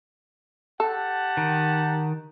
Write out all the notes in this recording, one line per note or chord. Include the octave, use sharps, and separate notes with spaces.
G4 A4 F#5 A5
D#3